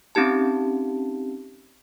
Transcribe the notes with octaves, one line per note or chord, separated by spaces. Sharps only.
C4 C#4 D#4 G4 A5